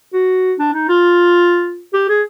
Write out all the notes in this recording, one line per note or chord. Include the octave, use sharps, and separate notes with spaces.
F#4
D4
D#4
F4
G4
G#4